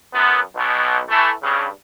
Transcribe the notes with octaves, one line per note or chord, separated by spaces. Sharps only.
F#2 B3
B1 B2
E3 A3
G2 C#3